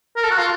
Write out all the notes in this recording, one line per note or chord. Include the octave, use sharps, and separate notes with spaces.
A#4
A4
F#4
F4